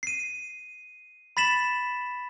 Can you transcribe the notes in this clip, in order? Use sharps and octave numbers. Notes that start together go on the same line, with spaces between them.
C7 D#7
B5 A6 B6 E7 F#7